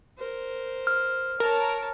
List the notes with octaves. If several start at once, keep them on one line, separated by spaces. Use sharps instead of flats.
A#4 C5
F6
A#4 C#5 A5